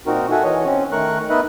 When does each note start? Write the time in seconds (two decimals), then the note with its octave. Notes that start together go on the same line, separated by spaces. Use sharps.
0.07 A#2 C4 D#4 F#4 A#4
0.31 F#4 A4 E5 F#5 G#5
0.44 E3 C#5 D#5
0.66 C4 C#4
0.92 D#3 A3 A#4 C#6 F#6
1.30 B3 D#4 B4 D#5 E5 F#6